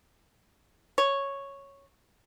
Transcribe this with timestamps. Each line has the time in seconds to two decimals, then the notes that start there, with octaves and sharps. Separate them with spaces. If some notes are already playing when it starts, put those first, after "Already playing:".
0.98 C#5